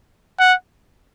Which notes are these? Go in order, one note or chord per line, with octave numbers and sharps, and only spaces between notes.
F#5